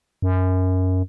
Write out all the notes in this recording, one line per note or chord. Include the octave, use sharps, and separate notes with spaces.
F#2